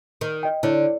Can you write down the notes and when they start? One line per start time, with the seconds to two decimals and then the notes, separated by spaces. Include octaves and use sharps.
0.21 D#3
0.43 D#5 G5
0.63 D3 E4 C#5